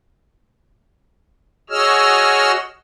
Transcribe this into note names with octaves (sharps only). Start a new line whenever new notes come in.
F#4 G#4 C#5 D#5 E6 F6